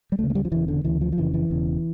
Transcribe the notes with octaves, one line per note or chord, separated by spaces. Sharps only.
G3
D2 C#3 A3
A3
G3
F3
E1 E2 C#3 E3
D3
D2 C#3 E3
F3
F3
F1 F2 C#3 E3
E3
E1 E2 C#3